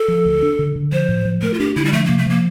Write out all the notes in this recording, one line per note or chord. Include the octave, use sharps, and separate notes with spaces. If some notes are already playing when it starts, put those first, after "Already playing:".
Already playing: A4
F3
D2
D4
D3
D3
F3 C5
A2
F3
A3 A#4
F4
D4 G4
D3 E4
G3
F3 A3
C3 A#3
A3
F3 A#3